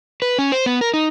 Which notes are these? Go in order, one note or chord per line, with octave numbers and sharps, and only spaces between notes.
B4
C#4
C5
B3
A#4
D#4